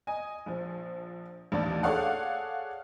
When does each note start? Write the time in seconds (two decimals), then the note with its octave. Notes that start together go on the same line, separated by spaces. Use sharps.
0.07 D#5 G#5
0.46 A#1 F3
1.52 A1 D#2 D4 D5 A5
1.83 G#4 A4 C#5 D5 F5 F#5